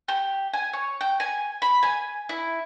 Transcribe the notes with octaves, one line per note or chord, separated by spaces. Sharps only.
G4
G#5
C#5
G5
G#5
B5
G#5
E4